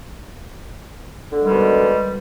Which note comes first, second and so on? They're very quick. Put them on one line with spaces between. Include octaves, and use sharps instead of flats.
D3 G#3 G3 D#3 B2